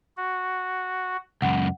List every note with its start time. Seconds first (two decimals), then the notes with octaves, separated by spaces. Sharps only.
0.17 F#4
1.42 C#2 F#2 F#5